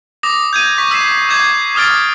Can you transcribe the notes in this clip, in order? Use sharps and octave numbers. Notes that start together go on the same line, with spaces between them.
D6 D#6 A#6
G6 G#6 D#7
C#6 B6
E6 B6 C7 E7
D6 G6 G#6 C7 E7
D6 D#6 F6 A6 D7